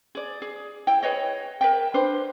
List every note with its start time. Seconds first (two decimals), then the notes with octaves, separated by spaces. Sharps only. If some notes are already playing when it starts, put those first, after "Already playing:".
0.15 G#4 D5
0.42 G#4
0.87 E4 G5
1.03 G#4 B4 C#5 D#5
1.61 A#4 E5 G5
1.94 D4 B4 C5